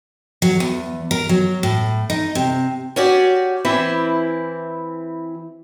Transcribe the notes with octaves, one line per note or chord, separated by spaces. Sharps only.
F#3
E2
A#4
F#3
A2
D#4
C3
C#4 F#4 G4 D5
E3 C4 E4